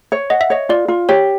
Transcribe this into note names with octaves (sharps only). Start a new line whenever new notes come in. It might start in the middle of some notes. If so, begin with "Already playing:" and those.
C#5
D#5 F#5
E5
C#5 D#5
F4 D5
F4
G4 C#5